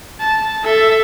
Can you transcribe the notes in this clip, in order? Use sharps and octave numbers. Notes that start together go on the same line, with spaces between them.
A5
A4 E5